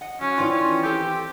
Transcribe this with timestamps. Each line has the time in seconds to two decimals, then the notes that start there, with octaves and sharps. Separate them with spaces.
0.01 D#5 F#5
0.21 F#3 C#4
0.38 D#3 E3 F4 D5 F5 G5
0.51 C#4
0.83 C4 G4 A4 C5